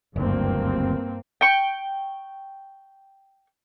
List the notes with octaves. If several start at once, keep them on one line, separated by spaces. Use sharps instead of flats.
F#1 D2 G2 A#3 C4
G5 C#6